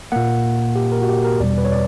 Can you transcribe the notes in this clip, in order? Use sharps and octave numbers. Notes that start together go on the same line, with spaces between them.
A#2 A#3 F#5
G4
A#4
F#4
G4
A#4
E2 B2 G3 D5
B4
C#5
D5